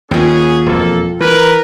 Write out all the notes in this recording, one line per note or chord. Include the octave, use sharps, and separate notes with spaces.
D#2 B3 C#4 F4 G#4 G5
E1 F2 A#3 A4
E3 A#4 B4